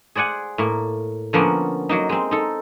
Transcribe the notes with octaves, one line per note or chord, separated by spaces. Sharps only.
G#4 C5 D5 F#5 G#5
A2 A#3
D3 F3 A#3 B3 C#4
F#3 A#3 D#4
G#3 C4
D#4 A4